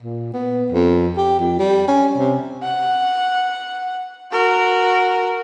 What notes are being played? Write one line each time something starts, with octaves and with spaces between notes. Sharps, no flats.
A#2
B3
F2
G4
F2
G3
C#4
C3
F#5
F#4 A#4